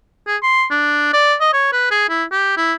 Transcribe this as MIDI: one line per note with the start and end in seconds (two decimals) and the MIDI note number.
0.27 0.37 68
0.43 0.65 84
0.71 1.12 62
1.14 1.35 74
1.41 1.52 75
1.53 1.68 73
1.73 1.89 71
1.91 2.08 68
2.09 2.24 64
2.32 2.55 67
2.57 2.74 64